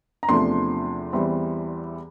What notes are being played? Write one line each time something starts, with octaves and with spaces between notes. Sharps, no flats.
A#5
E2 C3 F3 A3 D4 C6
E2 E3 G3 C4